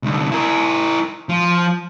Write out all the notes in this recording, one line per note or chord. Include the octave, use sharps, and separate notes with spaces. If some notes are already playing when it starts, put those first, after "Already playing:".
C2 D3
E4 A#4
F3